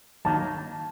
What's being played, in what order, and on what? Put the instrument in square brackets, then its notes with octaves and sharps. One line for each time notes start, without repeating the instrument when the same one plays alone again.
[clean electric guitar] G2 D#3 F#3 A#3 D#4 [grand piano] A5